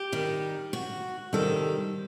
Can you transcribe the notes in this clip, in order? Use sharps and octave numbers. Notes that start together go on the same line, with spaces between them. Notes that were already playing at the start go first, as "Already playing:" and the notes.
Already playing: G4
D#3 G3 D#4
F#4
C3 D#3 G3 D#4 A4